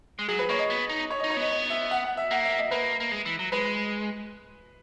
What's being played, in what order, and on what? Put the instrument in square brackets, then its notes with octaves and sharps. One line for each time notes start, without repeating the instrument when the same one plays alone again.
[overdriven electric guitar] G#3
[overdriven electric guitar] F#3 [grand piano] G#4
[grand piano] B4
[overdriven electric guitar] A#3 [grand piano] C#5
[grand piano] D#5
[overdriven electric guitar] B3
D#4
[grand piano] C#5
[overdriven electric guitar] D#4 [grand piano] D#5
[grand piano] C#5
[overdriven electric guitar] B3 [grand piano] D#5
[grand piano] D#5
E5
F#5
F#5
E5
[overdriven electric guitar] A#3 [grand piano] F#5
[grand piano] E5
D#5
[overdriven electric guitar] A#3 [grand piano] B4
[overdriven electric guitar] A#3
G#3
E3
F#3
[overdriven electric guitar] G#3 [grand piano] B4